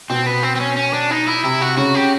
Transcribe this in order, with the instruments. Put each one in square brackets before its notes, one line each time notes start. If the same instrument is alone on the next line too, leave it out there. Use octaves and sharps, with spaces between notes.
[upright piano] B2 [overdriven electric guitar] C4
[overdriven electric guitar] B3
C4
C4
C#4
C#4
D4
D#4
E4
[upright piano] C3 [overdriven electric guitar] E4
[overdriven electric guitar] F#4
[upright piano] C#3 [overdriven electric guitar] F#4
[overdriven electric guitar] G4